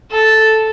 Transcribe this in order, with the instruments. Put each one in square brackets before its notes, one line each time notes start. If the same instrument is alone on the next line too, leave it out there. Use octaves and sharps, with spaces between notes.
[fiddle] A4